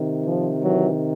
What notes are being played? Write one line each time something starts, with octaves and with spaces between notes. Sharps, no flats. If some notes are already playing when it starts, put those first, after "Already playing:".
Already playing: C3 D#3
F3
E3 F#3